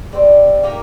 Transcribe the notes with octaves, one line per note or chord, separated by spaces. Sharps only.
G3 C4 D#4
A#3 D#4 G4 A#4